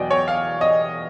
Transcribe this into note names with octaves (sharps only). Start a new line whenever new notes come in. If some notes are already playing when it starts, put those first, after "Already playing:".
Already playing: E2 B2 F#3 D5 D#5 G5
C#5
F5
D#5